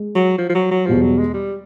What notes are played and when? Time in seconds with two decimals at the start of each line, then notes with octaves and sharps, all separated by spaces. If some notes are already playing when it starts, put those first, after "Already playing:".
Already playing: G#3
0.15 F#3
0.38 F3
0.49 F3
0.55 F#3
0.71 F#3
0.86 E2 B2 F3 G3
1.02 F#3
1.19 G#3
1.34 G3